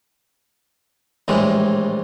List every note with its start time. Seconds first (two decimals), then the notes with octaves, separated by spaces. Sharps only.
1.28 A#1 A2 E3 G3 G#3